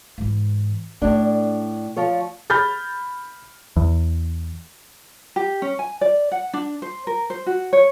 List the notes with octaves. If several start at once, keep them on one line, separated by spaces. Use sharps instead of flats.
G#2 E3
A2 A3 D4 D#4
F3 F4 C#5
B5 F6 G6 A6
E2
G4
C#4
G#5
D5
F#5
D4
C5
A#4
C5
F#4
C#5